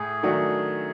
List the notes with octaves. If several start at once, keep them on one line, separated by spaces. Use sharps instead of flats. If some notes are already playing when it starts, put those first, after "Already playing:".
Already playing: A2 G#4
D#3 F#3 A3 D4 F#4